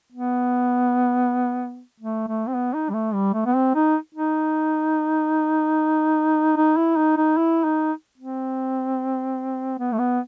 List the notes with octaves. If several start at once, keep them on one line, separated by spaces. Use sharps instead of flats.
B3
A3
A3
C4
B3
D#4
G3
A3
G3
A3
B3
C4
D#4
D#4
D#4
E4
D#4
D#4
E4
D#4
C4
B3
A3
B3